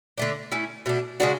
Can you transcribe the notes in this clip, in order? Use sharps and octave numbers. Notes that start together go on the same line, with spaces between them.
D3 A3 D4
A3 C#4 E4
B2 A3 D4
C#3 G#3 D4 F#4